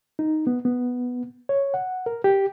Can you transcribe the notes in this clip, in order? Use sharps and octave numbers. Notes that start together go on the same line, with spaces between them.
D#4
B3
B3
C#5
F#5
A#4
G4